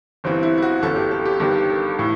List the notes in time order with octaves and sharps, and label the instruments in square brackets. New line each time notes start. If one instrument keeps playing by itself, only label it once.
[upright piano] G1 G2 E3 C4
E4
E4
F#4
G1 F#2 E3 A4
G4
A4
G4
G1 G2 D#3 G4
A4
A2 E3